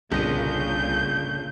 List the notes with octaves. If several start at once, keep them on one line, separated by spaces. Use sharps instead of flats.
G1 C2 A#2 C#3 D#6 G6 A#6 D#7